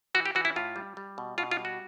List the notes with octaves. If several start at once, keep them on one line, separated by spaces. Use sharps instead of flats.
E3 F#4
G4
E3 F#4
E4
A2 F4
G3
G3
B2
B2 F4
F4
G3
F#4